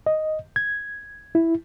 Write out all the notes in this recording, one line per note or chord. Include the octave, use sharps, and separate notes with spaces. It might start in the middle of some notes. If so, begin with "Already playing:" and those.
D#5
G#6
E4